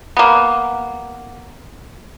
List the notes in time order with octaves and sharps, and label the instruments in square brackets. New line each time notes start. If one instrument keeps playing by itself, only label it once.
[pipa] A#3 B3